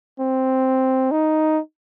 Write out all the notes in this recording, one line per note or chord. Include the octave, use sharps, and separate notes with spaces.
C4
D#4